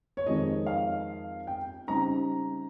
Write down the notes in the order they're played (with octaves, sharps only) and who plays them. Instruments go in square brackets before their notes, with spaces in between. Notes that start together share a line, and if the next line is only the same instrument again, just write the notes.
[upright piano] C#5
F2 D#3 G#3 C4 D#5
F5
G5
C#3 G3 C4 D#4 A#5